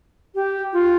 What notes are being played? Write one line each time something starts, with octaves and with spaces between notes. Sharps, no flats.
G4
F4